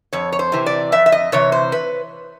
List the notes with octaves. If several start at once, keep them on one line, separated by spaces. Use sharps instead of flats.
F2 C#5
C#5
C5
C3 E3
D5
F2 E5
E5
D#5
C3 E3 C#5
C5
B4